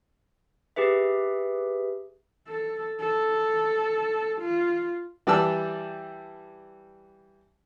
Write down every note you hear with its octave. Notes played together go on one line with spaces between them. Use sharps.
G4 G#4 B4 E5
A4
A4
F4
E3 G3 D5 G5 A5 E6